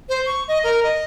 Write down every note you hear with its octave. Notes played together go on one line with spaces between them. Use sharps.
C5
C#6
D#5
A#4
D#5